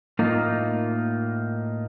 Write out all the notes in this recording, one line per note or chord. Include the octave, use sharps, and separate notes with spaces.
A2 A#3 D#4 F4